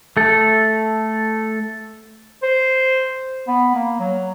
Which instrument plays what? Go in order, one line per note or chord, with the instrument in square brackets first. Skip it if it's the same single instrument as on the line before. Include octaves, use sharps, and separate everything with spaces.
[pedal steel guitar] A3 A4
[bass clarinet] C5
B3
A#3
F#3